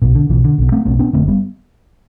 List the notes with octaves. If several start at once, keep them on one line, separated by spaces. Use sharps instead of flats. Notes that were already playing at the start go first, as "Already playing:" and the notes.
B1 B2
D3
B1 B2 E3
D3
B1 B2
A3 C4
B1 B2 A3 C4
B3 D4
F#2 D3 A3 C4
F#1
G3 B3